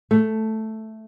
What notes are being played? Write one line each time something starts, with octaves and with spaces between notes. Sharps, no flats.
A3